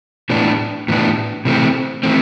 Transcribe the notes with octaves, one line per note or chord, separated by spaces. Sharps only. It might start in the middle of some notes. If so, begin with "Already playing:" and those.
A2 E3 B3 D4
A2 E3 B3 D4
C3 E3 A3 C4
E3 A3 C4